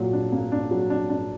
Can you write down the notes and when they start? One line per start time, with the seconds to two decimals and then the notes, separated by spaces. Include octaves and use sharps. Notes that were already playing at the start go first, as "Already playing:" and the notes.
Already playing: A#2 F#3
0.13 D4
0.32 A#3
0.52 D4
0.71 F#3
0.90 D4
1.09 D4